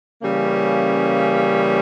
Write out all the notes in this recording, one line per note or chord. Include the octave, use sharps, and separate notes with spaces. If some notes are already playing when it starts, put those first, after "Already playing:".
C#3 E3 G3 A#3 C#4